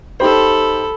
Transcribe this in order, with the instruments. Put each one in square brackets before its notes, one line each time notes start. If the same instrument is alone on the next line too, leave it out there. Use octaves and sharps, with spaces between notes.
[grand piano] D#4 G4 C5 [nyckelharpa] A4 B5